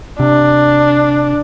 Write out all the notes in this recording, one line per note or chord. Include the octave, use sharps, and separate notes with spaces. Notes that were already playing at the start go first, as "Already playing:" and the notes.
C3 D4